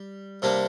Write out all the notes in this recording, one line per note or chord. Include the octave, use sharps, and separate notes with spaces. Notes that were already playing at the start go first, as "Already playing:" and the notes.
Already playing: G3
C3 G3 A#3 D4